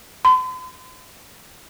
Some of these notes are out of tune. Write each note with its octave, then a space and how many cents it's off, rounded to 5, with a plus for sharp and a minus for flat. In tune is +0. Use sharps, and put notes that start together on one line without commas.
C6 -45